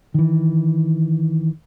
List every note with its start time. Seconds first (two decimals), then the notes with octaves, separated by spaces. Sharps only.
0.14 D#3 E3